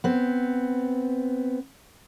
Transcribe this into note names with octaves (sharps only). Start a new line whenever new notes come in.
B3 C4